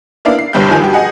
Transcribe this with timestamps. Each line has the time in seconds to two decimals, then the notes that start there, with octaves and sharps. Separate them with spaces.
0.25 A#3 B3 D4 E4 D5 F5
0.39 C7
0.53 G1 C2 G2 G4 G6
0.68 F1 D#3 F3 G#5 G6
0.80 G2 F#4 G4
0.93 G#4 D#5 F#5 G#5